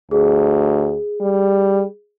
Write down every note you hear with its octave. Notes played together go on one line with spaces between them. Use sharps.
D2 G#4
G3